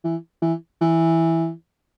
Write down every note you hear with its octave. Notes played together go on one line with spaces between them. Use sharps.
E3
E3
E3